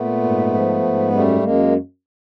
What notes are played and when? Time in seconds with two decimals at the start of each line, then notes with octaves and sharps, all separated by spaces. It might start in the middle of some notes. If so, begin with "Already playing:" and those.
Already playing: A#2 A3 B3
0.23 G#2
0.53 F3
0.83 G#2
1.12 F#2 G3 A3
1.42 F#2 G#3 A#3